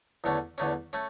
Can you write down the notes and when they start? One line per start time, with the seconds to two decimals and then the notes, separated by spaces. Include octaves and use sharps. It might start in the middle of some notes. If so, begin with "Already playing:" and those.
0.24 E2 D3 A3 C#4
0.58 E2 D3 A3 C#4
0.93 A3 C#4